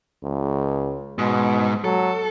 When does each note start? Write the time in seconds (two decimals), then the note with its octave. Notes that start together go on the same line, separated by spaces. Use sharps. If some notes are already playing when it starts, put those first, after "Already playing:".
0.24 C#2
1.19 G#2 B2
1.84 F#3 A4